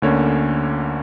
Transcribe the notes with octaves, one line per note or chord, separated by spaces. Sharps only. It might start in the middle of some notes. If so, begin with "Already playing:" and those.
D2 D3 A#3 C#4 C#5